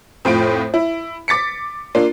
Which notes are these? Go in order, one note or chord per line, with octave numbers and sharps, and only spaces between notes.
F2 A2 F4 D7
E4
D6 A6 B6 C#7
A#3 D4 F4